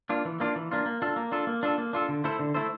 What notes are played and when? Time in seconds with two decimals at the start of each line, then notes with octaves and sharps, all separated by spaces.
0.09 A#3 D4 F4
0.25 E3
0.40 A#3 D4 F4
0.56 E3
0.71 A#3 D4 F4
0.86 A#3
1.02 D4 F4 A4
1.16 A#3
1.32 D4 F4 A4
1.47 A#3
1.63 D4 F4 A4
1.78 A#3
1.93 D4 F4 A4
2.09 D3
2.24 A3 E4 A4 C5
2.39 D3
2.54 A3 E4 A4 C5